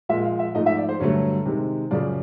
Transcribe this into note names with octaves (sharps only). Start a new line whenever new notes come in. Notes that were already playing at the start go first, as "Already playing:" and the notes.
A#2 F3 G#3 E5
F5
E5
G#2 F3 A3 D#5
E5
D5
C5
G2 D3 F#3 A3 C#5
C3 D#3 G#3
F#2 C#3 F3 D5